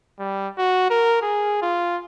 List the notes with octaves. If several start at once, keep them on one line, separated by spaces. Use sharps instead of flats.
G3
F#4
A#4
G#4
F4